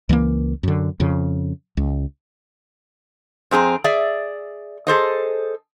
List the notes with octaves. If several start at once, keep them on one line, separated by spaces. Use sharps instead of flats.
C#2 E3 G#3 A#3
F#2 D3
F2 C#3
C#2
F2 C4 G#4 A#5
G#4 D5 E5
G#4 A4 C5 D#5